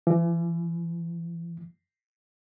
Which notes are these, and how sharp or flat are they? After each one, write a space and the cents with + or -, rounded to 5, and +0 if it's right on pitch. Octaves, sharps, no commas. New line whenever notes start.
E3 +40